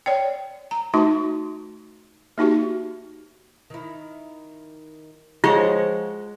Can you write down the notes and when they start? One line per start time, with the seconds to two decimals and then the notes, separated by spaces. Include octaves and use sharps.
0.06 C#5 D5 G5
0.71 A#5
0.94 A3 D#4 F#4 C6
2.38 A#3 D#4 F#4 G4
3.70 D#3 E4
5.44 F3 G#3 F4 C5 C#5 F#5